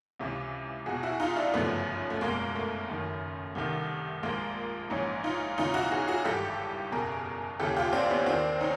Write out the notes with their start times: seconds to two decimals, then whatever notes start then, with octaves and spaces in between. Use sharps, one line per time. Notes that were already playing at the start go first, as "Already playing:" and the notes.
0.20 C#2 C3 E3
0.86 E2 B2 F#4 G#4
1.03 E4 F#4
1.20 D#4 F4
1.36 D4 E4
1.54 G1 F#2 C#3 F3 A3 B3
2.10 A3
2.21 F#1 E2 B2 G#3 A#3
2.55 A3
2.88 F#1 F#2 D#3
3.55 C2 C3 D#3
4.23 A#1 A#2 F3 G#3 A#3
4.90 A#1 G#2 E3 C#4 D#4
5.23 D#4 F4
5.58 E2 C#3 E3 D#4 F4
5.74 E4 F#4
5.91 F#4 G#4
6.08 F#4 G#4
6.25 G#1 G2 E3 G4 A4
6.92 F#1 E2 B2 G#4 A#4
7.59 D#2 C#3 E3 G4 A4
7.76 F4 G4
7.93 C4 D4
8.10 B3 C#4
8.26 D#2 D#3 C4 D4
8.60 C#4 D#4